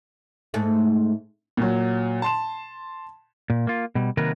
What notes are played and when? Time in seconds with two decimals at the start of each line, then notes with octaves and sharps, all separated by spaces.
0.54 G#2 A3
1.57 A#2 F#3
2.22 A5 C6 E7
3.50 A#2
3.67 A#3 F4
3.95 B2 G3
4.17 C3 D#3 F#3 A#3 A#4 B4